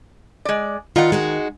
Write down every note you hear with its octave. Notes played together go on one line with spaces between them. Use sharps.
G#3 D5
D#3 F4 D5 F#5
G#3 D#4 F#4